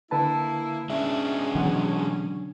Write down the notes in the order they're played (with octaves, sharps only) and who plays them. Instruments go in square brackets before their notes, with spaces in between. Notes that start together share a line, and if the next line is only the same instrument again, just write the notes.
[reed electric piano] D3 B4 A5 [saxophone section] A#3 E4
[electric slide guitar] G#3 D4 [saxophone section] C#4 [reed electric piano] E5
[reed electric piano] B2 E3 F#5 [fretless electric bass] D3 F#3